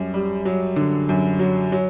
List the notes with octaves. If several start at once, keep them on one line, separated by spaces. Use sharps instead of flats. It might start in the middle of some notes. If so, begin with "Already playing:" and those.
Already playing: F#2 G3
G3
F#3
D3
F#2
F#3
F#3